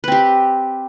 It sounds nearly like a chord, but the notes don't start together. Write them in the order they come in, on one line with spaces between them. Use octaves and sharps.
B4 C4 G4